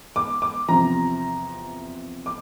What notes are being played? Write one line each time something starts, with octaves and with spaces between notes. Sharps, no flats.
D6
D6
E2 C3 F3 A#5
D6